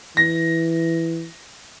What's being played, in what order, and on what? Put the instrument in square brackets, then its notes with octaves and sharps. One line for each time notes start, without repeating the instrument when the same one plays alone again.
[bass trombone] E3 [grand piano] A#6